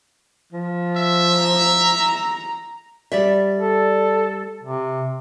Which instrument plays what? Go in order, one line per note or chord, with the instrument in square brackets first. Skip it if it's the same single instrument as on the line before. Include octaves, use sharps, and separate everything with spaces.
[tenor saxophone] F3
[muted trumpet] E5
[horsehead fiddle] A#5
[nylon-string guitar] G3 D5 E5
[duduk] A4
C3